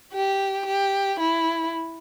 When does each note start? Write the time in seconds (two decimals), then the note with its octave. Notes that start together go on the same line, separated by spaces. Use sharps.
0.13 G4
0.66 G4
1.20 E4